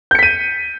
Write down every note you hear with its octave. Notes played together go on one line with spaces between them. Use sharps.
G6 B6 C#7 D#7